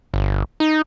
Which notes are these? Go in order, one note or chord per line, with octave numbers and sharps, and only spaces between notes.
G1
D#4